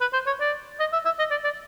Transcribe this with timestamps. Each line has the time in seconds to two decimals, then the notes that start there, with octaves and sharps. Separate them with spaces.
0.01 B4
0.13 C5
0.26 C#5
0.40 D5
0.80 D#5
0.93 E5
1.05 E5
1.19 D#5
1.31 D5
1.44 D5